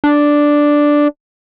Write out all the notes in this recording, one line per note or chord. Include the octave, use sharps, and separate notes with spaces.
D4